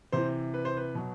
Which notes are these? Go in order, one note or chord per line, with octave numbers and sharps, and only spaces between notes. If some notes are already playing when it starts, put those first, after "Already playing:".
C3 E3 C5
B4
C5
B4
B2 F#3